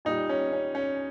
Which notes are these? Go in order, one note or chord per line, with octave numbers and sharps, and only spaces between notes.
A#2 G3 D#4
C#4
C#4
C#4